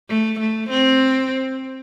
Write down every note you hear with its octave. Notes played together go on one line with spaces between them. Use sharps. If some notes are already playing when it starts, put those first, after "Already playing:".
A3
A3
C4